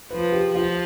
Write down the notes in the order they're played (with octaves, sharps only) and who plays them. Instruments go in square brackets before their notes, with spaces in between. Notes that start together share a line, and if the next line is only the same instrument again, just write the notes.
[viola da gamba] F3 [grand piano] B4
[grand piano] G4
[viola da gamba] F3 [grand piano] F4